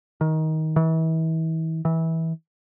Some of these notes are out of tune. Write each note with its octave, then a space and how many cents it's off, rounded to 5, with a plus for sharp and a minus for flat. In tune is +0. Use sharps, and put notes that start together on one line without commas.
D#3 +20
E3 -35
E3 -20